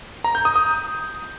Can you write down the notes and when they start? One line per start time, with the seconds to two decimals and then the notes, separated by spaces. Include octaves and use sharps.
0.24 A#5
0.35 G6
0.45 D#6
0.56 D#6